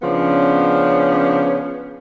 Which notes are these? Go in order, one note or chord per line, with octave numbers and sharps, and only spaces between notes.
C#3 F3 B3 C#4 D4